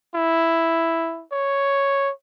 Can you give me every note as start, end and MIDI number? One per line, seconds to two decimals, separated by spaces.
0.15 1.24 64
1.32 2.11 73